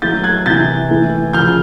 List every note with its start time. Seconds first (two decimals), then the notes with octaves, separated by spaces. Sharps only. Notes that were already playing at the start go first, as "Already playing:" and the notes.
0.02 A2 F#3 G6 A6
0.23 F#6 G#6
0.46 C3 E3 G6 A6
0.90 A2 E3
1.33 C#3 F3 F6 G6